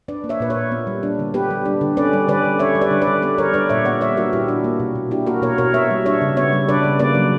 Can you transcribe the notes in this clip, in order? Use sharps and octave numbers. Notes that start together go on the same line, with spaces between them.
D4 B4 D5
A#3
C#5 E5
A#2 B4
A#4 C#5
A#2
B3
G3
D4
D3
B3 G4 B4
G3
D4
D3
C#4 B4 D5
G3
D3 B4 D5
D3
C#4 C#5 E5
G3
B4 D5
D3
B4 D5
D3
B3 B4 D5
G3 A#4 C#5
D4 B4 D5
A#2 C#5 E5
B3 D5 F#5
G3 C#5 E5
D4 F#4 A#4
A#2 E4 G4
D4 F#4
A#3
B2
B2
D4 E4 G4
A#3 F#4 A#4
B2 A#4 C#5
B2 A#4 C#5
B3 C#5 E5
G3
D4 C#5 E5
C#3
B3 C#5 E5
G3
D4 B4 D5
C#3
A#3 B4 D5
F#3